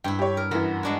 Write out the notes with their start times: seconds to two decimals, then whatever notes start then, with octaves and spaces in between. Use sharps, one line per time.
0.04 G2 E4 G5
0.19 G4 C#5
0.37 A#4
0.51 F#2 E3 B3
0.83 G#3 D4 F#4